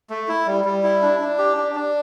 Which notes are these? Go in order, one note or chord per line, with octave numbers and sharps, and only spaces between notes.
A3
E4
G3
G3
E4
D4
D4
G4
D4
D4